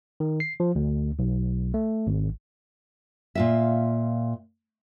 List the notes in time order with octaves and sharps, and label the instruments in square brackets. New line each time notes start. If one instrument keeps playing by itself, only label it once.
[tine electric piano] D#3
C7
F3
D2
B1
A3
G#1
[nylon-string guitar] A#2 F4 E5